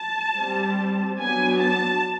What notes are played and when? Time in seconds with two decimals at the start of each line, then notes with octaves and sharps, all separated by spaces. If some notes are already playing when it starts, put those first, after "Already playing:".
Already playing: A5
0.37 G3 C4
1.18 F#3 B3 D4 G#5
1.60 A5